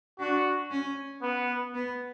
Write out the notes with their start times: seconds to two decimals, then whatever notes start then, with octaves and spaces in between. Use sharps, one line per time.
0.19 D4 F#4
0.71 C#4
1.22 B3
1.74 B3